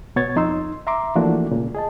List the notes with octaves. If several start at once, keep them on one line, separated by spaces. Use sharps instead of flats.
B2 B3 C#5 C#6 G#6 A6
F2 D#4 C6 E6
E5 A#5 C6 D6
E3 F3 A3 A#3 D4 F#4
C2 A#2 C#3
G#4 D#5 A5